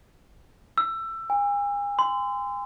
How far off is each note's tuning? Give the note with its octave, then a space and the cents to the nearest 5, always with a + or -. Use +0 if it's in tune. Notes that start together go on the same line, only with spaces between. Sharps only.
E6 +20
G#5 -40
C6 -30